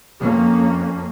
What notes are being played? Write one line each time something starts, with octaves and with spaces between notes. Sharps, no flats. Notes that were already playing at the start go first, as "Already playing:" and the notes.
F2 A#3 C#4